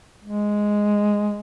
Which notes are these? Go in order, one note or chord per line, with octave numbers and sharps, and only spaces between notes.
G#3